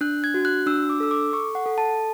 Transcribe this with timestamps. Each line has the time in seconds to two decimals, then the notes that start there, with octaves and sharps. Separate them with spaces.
0.01 D4 F#6
0.24 G#6
0.34 F#4
0.45 F#6
0.67 D4 E6
0.90 D6
1.00 A4 E6
1.11 D6
1.33 A4 C#6
1.55 F#5
1.66 A4
1.78 A5